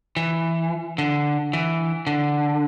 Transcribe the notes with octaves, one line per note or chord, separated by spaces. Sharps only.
E3
D3
E3
D3